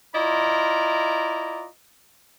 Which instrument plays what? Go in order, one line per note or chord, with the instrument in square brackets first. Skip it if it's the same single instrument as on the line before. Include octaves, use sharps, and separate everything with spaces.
[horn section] E4 F4 D5 D#5 A#5